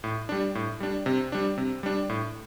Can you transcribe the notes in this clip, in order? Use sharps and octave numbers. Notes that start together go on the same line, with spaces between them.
A2
G3 D4
A2
G3 D4
C3
G3 D4
C3
G3 D4
A2